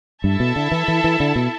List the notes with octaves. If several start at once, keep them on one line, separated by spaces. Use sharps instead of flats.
G2 E4 A4 E5 A5
B2
D3
E3
E3
E3
D3
B2